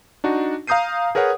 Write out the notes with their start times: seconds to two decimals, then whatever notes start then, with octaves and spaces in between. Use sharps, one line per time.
0.24 D4 D#4 F#4
0.67 F5 A#5 D#6 G6 C7 D#7
1.15 G#4 A#4 B4 C#5 F#5